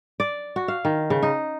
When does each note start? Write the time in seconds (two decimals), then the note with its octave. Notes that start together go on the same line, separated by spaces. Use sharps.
0.20 D5
0.56 F#4
0.68 F5
0.85 D#3
1.10 C#3
1.22 D#4